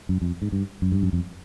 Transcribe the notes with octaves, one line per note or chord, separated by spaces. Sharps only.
F#2
F2
G#2
G2
F#2
G2
F#2
F2